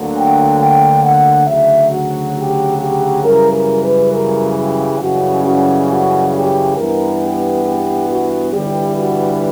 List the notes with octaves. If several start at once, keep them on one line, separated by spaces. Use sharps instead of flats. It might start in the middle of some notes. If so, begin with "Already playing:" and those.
Already playing: D2 D3 F#3 A#3
G5
G5
F#5
D2 C#3 F#3 E5
F#4
G4
G4
F#2 C#3 E3 G3 A#4
A#4
B4
A#4
G4
F#2 C#3 E3 G3 C#4 F#4
F#4
F#4
G4
G2 E3 G3 B3 A#4
G4
G4
F#4
G1 G2 E3 G3 G4
F#4